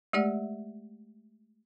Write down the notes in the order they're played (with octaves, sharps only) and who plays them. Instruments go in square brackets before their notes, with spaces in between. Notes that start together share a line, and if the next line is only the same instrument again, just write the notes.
[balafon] G#3 A3 G4 D5 E5 F#5